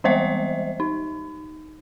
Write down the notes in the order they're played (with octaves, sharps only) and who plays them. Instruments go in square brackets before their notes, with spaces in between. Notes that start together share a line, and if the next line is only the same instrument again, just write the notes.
[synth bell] E3 G3 G#3 C5 D#5 E5
D#4